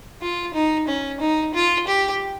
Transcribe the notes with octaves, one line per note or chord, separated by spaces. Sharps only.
F4
D#4
C#4
D#4
F4
G4